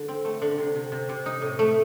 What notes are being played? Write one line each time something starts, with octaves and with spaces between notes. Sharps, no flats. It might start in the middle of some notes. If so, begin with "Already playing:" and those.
Already playing: D3
C4
A3
D3
C3
C3
C3
C3
D#4
A2
A3